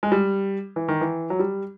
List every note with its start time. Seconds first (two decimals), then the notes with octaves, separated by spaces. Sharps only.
0.03 G#3
0.12 G3
0.76 E3
0.88 D#3
1.01 E3
1.30 F#3
1.39 G3